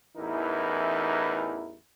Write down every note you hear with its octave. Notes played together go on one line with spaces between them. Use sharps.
A1 E2 E3 D#4 E4 A#4